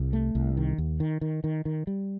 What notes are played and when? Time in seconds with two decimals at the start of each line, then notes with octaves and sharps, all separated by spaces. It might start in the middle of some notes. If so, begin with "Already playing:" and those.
Already playing: C2
0.13 A3
0.35 C2
0.57 D#3
0.78 D#2
1.00 D#3
1.21 D#3
1.44 D#3
1.65 D#3
1.87 G3